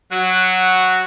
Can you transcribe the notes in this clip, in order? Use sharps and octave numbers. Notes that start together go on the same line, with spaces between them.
F#3 F#4